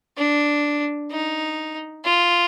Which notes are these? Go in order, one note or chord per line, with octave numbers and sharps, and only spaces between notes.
D4
D#4
F4